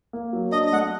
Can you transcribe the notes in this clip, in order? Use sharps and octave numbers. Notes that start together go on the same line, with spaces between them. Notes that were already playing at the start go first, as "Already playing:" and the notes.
A#3
F#3
D4 D#5
D#5
A3 F#5